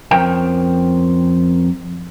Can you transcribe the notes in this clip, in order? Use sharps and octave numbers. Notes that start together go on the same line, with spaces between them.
F2 C#4 A#4 C5 G5